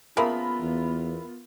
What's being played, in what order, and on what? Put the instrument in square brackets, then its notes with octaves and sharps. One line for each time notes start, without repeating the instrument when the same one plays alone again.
[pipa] C#3 F3 A#3 [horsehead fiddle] B3 F4 [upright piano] A#4 E5 B5
[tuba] E2